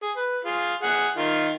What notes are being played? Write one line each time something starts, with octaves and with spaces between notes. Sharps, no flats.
G#4
B4
F4 G#4
G#4 F#5
D#3 F4